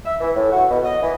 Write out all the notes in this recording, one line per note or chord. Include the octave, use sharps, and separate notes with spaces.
E5
E3
A2
F#4
B2
D#5
E3